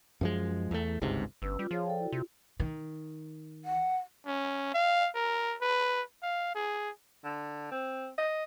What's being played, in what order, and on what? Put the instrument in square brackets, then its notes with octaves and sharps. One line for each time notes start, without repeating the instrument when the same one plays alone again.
[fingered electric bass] F#2 F3 G#3
E2 A3
G1 C#2 G#2 C3
[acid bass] G1 [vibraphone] C#4 B4 E6
[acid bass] G3 [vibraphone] F4
[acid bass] F3 [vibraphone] G#4 C#5 F5
[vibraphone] A4 D5 G5
E4 F#4
[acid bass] C3 [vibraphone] F4
[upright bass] D#3
[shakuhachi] F#5
[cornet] C#4
F5
A#4
B4
F5
G#4
[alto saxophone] D3
C4
D#5